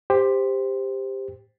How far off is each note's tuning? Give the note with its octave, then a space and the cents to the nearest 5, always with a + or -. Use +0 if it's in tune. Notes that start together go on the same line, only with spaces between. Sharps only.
G4 +15 C5 -5